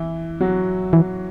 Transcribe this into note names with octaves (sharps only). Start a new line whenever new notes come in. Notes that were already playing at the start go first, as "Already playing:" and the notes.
Already playing: E3 E4
F#3 F#4
E3